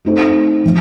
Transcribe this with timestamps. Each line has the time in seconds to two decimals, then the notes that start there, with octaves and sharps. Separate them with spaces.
0.05 A3 C4 D#4 A4 C5
0.64 F3 A3